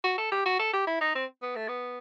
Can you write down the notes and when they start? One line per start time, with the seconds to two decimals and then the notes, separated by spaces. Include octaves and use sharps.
0.04 F#4
0.18 A4
0.32 G4
0.46 F#4
0.59 A4
0.73 G4
0.87 E4
1.01 D#4
1.15 C4
1.43 B3
1.56 A3
1.68 B3